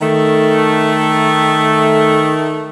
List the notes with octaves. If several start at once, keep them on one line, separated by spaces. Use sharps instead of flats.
D#3 A3